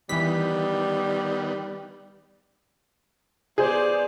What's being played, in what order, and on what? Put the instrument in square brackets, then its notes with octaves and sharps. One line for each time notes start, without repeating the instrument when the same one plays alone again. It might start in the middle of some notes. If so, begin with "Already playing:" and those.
[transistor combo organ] D#3 B3 [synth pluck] E3 B6 [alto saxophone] G3
[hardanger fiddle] B3 D5 [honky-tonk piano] G#4 C5